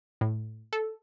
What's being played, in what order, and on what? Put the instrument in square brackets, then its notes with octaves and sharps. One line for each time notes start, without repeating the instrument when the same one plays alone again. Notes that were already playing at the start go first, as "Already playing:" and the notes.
[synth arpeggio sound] A2
A4